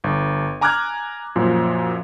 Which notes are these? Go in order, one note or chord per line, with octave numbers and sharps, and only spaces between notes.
G1
G#5 A#5 D6 F6 F#6 G#6
F#2 A#2 F3